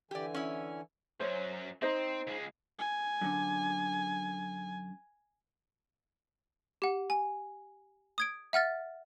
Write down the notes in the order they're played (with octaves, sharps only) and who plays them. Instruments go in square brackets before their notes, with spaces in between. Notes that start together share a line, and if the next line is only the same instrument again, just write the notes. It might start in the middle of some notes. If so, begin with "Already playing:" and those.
[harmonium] D3 E3 G#5 [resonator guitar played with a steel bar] G4 D5
[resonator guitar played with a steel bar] C#4 E4
[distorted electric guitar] F#2 F#3 [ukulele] C5 C#5
[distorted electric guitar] C4 [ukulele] D#4 C5 D#5
[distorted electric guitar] C#2 G#3
[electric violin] G#5
[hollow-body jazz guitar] F#2 D3
[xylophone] G4 F#5
G#5
D#6 G#6 D7
E5 F#5 F6 A6